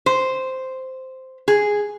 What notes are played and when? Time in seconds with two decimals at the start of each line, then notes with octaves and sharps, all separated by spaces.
0.06 C5
1.48 G#4